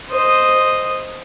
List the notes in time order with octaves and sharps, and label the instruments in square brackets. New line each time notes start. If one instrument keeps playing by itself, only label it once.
[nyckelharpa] C5 D#5